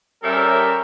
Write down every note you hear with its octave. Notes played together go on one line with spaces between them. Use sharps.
G3 C#4 G4 A4 A#4 E5